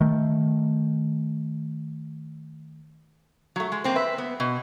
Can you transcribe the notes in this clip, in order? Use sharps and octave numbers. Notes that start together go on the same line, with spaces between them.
D#3 A3
F#3 A3
G#3
A#3 C4 C5
B4 E5
B3
B2